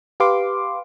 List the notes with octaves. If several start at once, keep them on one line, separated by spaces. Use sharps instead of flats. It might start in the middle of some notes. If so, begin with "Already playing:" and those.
G4 B4 F5 C6 D6